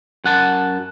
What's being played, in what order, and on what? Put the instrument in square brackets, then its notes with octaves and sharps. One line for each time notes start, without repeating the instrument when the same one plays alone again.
[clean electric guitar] F#2 F#5 A5